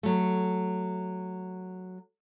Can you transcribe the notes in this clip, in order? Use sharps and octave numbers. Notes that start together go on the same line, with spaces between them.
F#3 A3